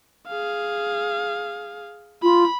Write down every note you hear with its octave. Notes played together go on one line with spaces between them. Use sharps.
G#4 F5
F4 B5